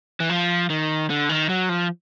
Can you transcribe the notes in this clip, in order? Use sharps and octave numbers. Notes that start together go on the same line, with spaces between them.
E3
F3
D#3
D3
D#3
F#3
F3